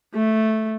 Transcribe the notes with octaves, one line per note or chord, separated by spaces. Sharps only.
A3